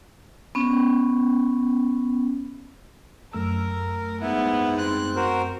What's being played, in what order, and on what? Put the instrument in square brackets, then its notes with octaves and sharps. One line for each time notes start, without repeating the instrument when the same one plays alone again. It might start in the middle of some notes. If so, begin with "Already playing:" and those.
[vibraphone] B3 C#4
[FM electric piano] F#2 A3 E6 [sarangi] A#4
[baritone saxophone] G#2 [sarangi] B3 [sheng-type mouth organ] E4
[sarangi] C4 [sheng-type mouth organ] F#6
[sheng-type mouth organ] F#4 A#4 C5